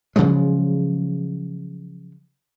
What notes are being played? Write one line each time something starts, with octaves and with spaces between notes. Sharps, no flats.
C#3 F3 F#3 G#3